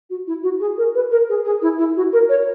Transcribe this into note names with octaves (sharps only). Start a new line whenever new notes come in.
F#4
E4
F#4
G#4
A#4
B4
A#4
G#4
G#4
E4
E4
F#4
A#4
C#5